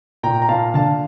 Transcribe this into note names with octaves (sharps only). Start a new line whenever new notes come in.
A#2 G5 A#5
A#5
A#2 F5 A5
D3 F5 A5